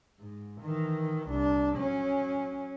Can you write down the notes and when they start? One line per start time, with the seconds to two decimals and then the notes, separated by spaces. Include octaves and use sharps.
0.19 G#2
0.61 D#3 E3
1.29 C2 D4
1.76 F#3 C#4